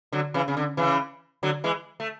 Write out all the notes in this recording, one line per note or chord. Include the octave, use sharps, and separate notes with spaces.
D3 F#3
C#3 E3
C#3
D3
C#3 E3
D3 F#3
E3 G#3
A3